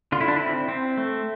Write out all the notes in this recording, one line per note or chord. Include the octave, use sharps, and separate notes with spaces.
D3 F4
E4
D4
C4 E4
C4
A3